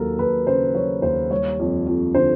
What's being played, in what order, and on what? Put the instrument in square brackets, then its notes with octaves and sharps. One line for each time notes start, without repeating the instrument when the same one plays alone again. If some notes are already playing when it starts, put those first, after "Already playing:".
Already playing: [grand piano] D#2 F#3 [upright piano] A4 A#4
[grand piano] D#2 [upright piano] B4
[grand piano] C#3 [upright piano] C5
[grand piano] F#3 [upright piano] C#5
[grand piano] D#2 [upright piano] C5
[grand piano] G3 [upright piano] C#5
[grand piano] F2
F2
[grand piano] D3 [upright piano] C5